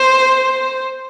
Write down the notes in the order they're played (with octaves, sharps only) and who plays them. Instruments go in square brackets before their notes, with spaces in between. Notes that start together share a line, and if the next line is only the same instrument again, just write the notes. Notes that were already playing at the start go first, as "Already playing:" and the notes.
Already playing: [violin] C5